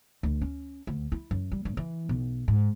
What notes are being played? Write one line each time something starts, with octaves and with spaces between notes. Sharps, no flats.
D2
C#4
D2
E4
F#2
G3
G2
E3
B1
G#2